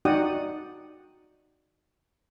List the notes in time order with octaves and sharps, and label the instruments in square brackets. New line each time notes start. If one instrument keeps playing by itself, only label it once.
[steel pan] D#4 F#4 D5 F#5 G5 D#6